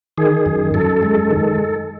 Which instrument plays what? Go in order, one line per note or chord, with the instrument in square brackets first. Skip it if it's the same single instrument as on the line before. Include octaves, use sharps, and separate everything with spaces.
[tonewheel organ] D#3 G#4
F#2
F#2 A4
G#3
D#3